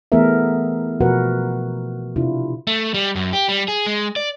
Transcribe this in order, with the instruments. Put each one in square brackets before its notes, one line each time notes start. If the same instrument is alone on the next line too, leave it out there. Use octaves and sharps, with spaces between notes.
[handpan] E3 A3 B3 G#4 A#4 E5
B2 F3 F#4 A#4 B4 F#5
C3 D4 E4 F4
[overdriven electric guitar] A3
G3
F#2
G4
G3
G#4
G#3
D5